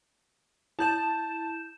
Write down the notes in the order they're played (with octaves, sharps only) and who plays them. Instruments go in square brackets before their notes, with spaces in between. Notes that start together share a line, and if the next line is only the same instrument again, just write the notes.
[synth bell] E4 G6 E7 [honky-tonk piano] A5